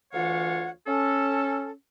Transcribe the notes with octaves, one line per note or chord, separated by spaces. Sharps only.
D2 E3 F4 C#5 F5 F#5
C#4 A4